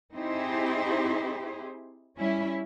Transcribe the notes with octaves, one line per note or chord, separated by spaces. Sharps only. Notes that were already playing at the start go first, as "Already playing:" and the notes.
C4 D#4 E4 G4 G#4 C5
G3 C#4 E4